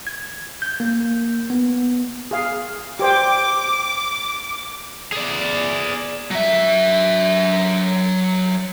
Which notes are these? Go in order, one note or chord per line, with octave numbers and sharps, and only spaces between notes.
G#6
G6
A#3
B3
G#4 F5
G4 C5 G5 D6
G#4 D5
F#3 E5